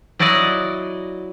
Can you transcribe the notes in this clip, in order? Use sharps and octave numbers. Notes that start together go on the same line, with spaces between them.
F#3 E4 F#4 D5 D#5